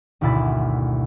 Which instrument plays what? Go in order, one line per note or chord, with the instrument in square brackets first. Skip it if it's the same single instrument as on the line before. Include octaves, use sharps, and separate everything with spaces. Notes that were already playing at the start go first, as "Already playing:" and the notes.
[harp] G#1 D2 B2 E4 B5 A6